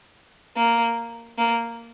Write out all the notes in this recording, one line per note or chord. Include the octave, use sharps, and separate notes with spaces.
A#3
A#3